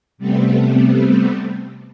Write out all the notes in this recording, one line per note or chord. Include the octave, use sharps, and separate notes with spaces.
C3 G3 A3 B3 C4